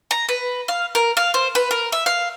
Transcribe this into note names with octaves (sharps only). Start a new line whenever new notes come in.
A#5
B4
F5
A#4
F5
C5
B4
A#4
E5
F5